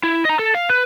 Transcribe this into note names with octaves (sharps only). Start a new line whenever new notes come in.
E4
D#5 A#5
A4
F5
B4